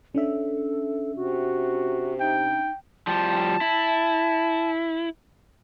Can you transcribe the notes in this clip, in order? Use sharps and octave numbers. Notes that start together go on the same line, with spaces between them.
C#4 D4 A4 E5
C3 F#4
D#4 G5
F3 G3 A5
E4